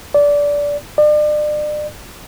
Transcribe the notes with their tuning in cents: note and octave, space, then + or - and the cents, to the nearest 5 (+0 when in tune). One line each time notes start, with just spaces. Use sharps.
D5 -20
D5 +35